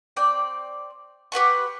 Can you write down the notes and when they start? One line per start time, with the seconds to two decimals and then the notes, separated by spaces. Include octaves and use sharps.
0.16 C4 D5 G5
1.32 G4 B4 F#5 C#6